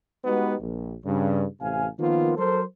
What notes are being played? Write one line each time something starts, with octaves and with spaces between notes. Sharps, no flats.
G#3 B3 D#4 F#4 G4 B4
A#1
G2 C#3
A1 C3 F5 G#5
D#3 F3 A#3 B3 F4
F#3 A4 A#4 C5